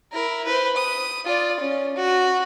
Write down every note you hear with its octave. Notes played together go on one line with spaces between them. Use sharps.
E4 A#4
B4 C5
D#6
F4 D5
C#4
F#4